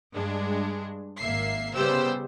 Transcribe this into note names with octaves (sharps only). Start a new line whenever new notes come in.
G2 G#3 D4
G#1 A#3 E5 C7
C#3 G3 B3 G4 C5 E6